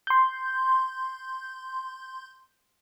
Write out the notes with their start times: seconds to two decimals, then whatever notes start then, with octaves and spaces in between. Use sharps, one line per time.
0.07 C6 G6